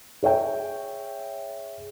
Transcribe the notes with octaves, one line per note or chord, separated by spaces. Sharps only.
G#4 C#5 E5 G5